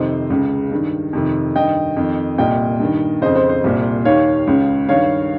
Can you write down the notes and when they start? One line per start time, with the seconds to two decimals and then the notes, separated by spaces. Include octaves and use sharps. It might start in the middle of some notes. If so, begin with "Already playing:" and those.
Already playing: F2 C3 D#3 C5 D#5
0.30 C#2 C#3
0.72 G2 D#3
1.13 F2 C3 D#3
1.56 G2 D#3 D#5 G5
1.97 F2 D#3
2.38 C2 A#2 D#5 G5
2.80 G2 D#3
3.21 F2 C#3 C5 D#5
3.36 C5
3.49 C5
3.64 C2 A#2
4.05 D#2 D#3 C#5 F5
4.47 C#2 C#3
4.89 G2 D#3 C#5 F5